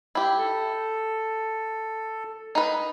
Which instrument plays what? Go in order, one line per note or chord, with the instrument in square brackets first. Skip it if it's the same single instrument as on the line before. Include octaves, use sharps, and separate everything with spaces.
[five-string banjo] E4 G4
[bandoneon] A4
[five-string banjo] D#4 B4